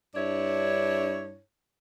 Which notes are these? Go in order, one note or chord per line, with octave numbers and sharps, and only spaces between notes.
G2 D4 E4 C#5